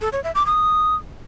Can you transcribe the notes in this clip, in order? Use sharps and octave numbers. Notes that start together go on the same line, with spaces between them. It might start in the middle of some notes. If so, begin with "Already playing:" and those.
A4
C#5
E5
D6
D#6